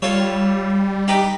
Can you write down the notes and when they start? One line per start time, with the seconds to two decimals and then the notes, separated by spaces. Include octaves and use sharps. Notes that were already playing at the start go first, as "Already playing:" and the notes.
0.02 G3 F4 A4 C#5
1.08 D#4 G4 B4